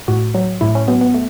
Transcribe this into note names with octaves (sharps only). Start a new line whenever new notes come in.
A2 F#4
F#3
A2 E4
C#4
F#3 B3
B3
A3